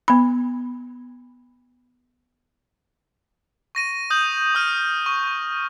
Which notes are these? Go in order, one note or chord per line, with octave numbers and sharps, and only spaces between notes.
B3 B5
C#6 A#6 D#7
D#6 G6 F#7
D#6 F6 D#7
C#6